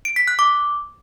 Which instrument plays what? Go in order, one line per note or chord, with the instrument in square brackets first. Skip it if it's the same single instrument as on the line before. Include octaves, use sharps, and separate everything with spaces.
[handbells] D7
B6
F#6
D6